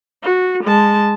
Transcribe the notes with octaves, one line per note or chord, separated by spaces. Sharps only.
F#4
G#3 A5